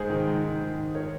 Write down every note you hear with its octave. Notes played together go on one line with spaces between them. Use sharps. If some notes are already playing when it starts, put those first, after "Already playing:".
Already playing: G#2 G#4 C5
D#3
G#2
D#3
G#2
D#3
A#4 C#5